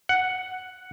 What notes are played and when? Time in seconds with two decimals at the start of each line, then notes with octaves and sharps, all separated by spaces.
0.09 F#5